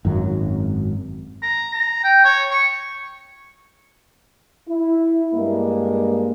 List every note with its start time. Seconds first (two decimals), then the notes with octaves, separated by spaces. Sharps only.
0.05 G#1 F#2 F#3
1.43 A#5
1.74 A#5
2.04 G5
2.25 C#5
2.51 C#6
4.69 E4
5.34 G2 G#3 A#3